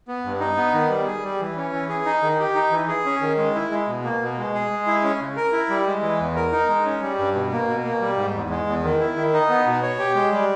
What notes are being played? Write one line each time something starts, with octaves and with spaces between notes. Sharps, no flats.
B3
G2
D#4
B3
D#3
G3
G#4
G3
E3
C#4
E3
G#4
D#4
D#3
G4
D#4
E3
G#4
C#4
D#3
G#3
E4
G#3
B2
A#3
B2
G#3
G#4
G#3
E4
C#4
C#3
A#4
E4
G3
G#3
E3
E2
A#4
D#4
G#3
C#4
G3
G2
B2
A#3
B2
A#3
G3
G#2
E2
G#3
E2
D#3
E4
D#3
D#4
B3
B2
C#5
G4
G#3
G3